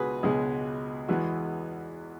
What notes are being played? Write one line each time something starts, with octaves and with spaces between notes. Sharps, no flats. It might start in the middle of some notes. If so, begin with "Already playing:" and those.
Already playing: C#2 B2 F#4 G#4 B4
C#2 B2 G#3 G#4
E2 E3 G#3 B3 F#4